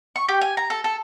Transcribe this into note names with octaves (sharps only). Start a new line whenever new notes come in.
C#6
G4
G#5
A#5
A4
A4